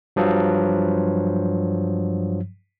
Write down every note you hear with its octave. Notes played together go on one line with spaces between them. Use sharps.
G2 F3 F#3